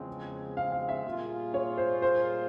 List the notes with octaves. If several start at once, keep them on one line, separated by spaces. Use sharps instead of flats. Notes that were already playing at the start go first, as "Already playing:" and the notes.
Already playing: E2 C#3 F3 G#3 C4
F5
F5
E5
A#2 G3 A#3 F4 G#4
C#5
C5
C5